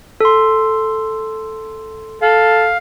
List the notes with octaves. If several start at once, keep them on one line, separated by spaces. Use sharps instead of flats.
A4 C6
A4 F5